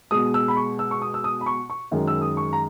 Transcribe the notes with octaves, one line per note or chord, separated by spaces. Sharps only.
B2 G#3 D#6
E6
B5
C#6
E6
C#6
D#6
E6
D#6
B5
C#6
C#6
F#2 D#3 G#3
E6
D#6
C#6
A#5